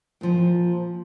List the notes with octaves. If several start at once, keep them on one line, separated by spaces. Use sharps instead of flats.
A#2 F3